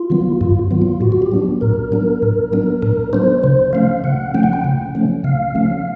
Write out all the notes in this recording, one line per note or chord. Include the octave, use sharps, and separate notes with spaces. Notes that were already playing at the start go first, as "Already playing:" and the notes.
Already playing: F4
D#3 F#3 B3
G2 F4
D#3 F#3 B3
F4
A2 F#4
F#4
G4
F#3 B3 D4
A2 A#4
F#3 B3 D4
A2
F#3 B3 D4
A2 A#4
F#3 B3 D4 C5
C#3 C5
F3 A3 C#4 F5
C#3 F#5
F3 A3 C#4 G5
F#5
G5
C#3
F3 A3 C#4
C#3 F5
F3 A3 C#4